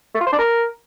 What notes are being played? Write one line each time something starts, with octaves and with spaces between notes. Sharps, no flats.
A3
F4
C5
D4
A#4